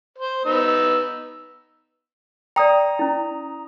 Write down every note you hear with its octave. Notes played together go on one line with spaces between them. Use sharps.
C5
B3 D#4 E6
D5 G5 A#5 D#6
C#4 E4